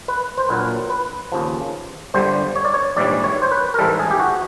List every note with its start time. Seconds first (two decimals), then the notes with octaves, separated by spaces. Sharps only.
0.08 B4
0.38 C5
0.49 A#1 A#2 F#3 B4
0.90 B4
1.32 D#2 C#3 F3
2.14 G1 G2 D3 G3 C5
2.55 C#5
2.65 D5
2.74 C#5
2.96 A#1 G#2 E3 G3 D5
3.24 C#5
3.42 C5
3.52 B4
3.74 A#4
3.79 A1 G#2 E3 G3 A4
3.99 G#4
4.11 G4
4.20 F#4